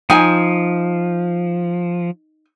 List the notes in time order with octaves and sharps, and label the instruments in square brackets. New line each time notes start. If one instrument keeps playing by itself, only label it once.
[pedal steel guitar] F3 [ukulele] D#4 G#5